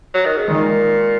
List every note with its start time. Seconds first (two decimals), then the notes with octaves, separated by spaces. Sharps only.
0.14 F#3
0.25 D#3
0.37 C#3
0.48 A#2 D#3 G#3